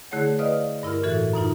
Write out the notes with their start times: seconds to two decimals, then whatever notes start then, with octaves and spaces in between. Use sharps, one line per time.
0.11 D3 A3 E4 G#4 C#5 F#5
0.39 B4 D5 D#5 F5 D#6 F6
0.83 G2 E4 A#4 F6
1.03 A2 E3 F#4 A4 E5
1.33 F#2 B2 D#4 F4